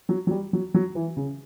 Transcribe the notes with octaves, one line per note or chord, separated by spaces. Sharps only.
F#3
F#3
G3
F#3
F#3
E3
C#3